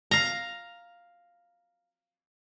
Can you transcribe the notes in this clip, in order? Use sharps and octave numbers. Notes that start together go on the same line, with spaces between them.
F5 A#5